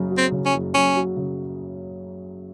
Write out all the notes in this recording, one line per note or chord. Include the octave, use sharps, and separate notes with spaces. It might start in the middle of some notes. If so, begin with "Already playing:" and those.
Already playing: F#1 F#2 C#3 F#3
F#3
C4
C#3
C#4
F#1
F#2 C#4
F#3
C#3